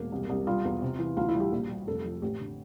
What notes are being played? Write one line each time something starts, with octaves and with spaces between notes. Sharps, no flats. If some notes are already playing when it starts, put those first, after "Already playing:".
Already playing: E1 A#3
C2
C2
G3 F4
E2
C3
E3
D2 F4
E4
G3
G4
A#1
G3
F1 A4
F3
A1 G4
D3